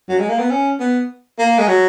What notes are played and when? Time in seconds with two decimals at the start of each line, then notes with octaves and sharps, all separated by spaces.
0.08 F#3
0.19 G#3
0.29 A#3
0.39 B3
0.50 C#4
0.80 B3
1.38 A#3
1.58 G#3
1.68 F#3